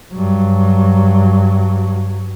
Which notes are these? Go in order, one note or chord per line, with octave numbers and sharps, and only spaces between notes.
G2 F#3